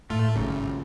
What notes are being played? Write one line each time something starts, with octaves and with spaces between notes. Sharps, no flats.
A2 A3 F4
G#1 F#2 A#2 C#3 C#4 F4